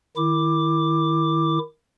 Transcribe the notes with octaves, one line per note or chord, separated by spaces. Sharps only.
D#3 E4 D6